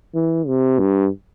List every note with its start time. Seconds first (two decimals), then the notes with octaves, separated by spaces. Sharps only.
0.15 E3
0.47 C3
0.79 G2